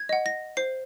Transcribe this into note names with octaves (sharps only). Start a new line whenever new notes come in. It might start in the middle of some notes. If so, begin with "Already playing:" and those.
Already playing: G#6
D#5 F#5
A#6
C5 C7